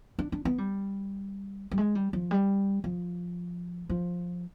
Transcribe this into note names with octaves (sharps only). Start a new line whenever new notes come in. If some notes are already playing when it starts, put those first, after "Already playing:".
D4
D4
B3
G3
G3
G#3
G3
F3
G3
F3
F3